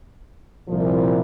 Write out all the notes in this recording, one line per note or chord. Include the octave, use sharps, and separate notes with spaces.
C2 A#2 F3